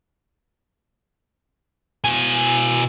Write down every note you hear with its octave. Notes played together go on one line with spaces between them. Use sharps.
B2 G#5